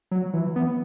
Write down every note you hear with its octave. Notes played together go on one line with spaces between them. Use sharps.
F#3
E3
B3